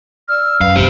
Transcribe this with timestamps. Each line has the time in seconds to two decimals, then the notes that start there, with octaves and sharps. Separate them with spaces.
0.29 D5 E6 F6
0.61 F#2 B4 F5
0.76 A#1 G#2 G4 C5